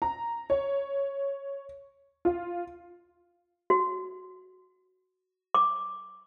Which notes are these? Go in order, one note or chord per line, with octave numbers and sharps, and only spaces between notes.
A#5
C#5
F4
F#4
D6